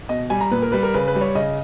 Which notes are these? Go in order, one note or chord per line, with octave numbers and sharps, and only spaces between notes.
B2 D#5
G3 G#5
A#5
A#2 B4
A#4
G3 B4
A#4
C#3 B4
B4
G3
C#5
C#3 D#5